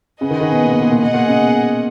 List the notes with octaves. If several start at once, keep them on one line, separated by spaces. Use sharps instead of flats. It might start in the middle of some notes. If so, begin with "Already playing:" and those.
C#3 G#4 B4 D#5 F#5
D#3
D#3
B2
A#2
B2
A#2
A#2
B2 G#4 D#5 F#5
A#2
C#3
B2